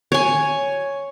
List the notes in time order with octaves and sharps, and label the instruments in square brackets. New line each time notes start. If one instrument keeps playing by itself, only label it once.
[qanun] C#5 G#5